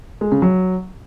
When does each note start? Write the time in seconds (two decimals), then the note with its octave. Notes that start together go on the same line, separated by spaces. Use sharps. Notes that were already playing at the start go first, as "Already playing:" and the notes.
0.21 G#3
0.32 C#3
0.42 F#3